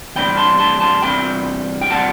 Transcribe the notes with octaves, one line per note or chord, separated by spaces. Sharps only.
E2 C3 G3 C4 G5 B5
A5 C6
A5 C6
A5 C6
E2 C3 G3 C4 G5 B5
G5
C3 G3 C4 F#5 A5